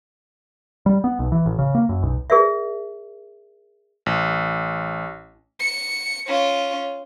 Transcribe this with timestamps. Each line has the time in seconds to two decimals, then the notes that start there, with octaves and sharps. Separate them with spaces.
0.86 G3
1.04 B3
1.19 B1
1.32 E3
1.46 A1
1.59 C#3
1.75 A#3
1.89 F#2
2.03 B1
2.30 G#4 A#4 D5 E5
4.06 A1
5.60 C#7
6.27 C#4 F4